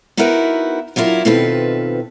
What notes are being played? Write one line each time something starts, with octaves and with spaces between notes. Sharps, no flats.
B3 D#4 E4 F#4 A#4 B4
F#3 D4 E4 F4 A#4
B2 D#3 C4 F4 A4 B4